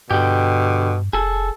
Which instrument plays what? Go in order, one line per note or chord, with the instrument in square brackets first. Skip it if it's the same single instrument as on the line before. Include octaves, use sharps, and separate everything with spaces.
[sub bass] G2 [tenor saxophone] B2 [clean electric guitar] D3 G4
[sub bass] F1 [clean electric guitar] G#4 A4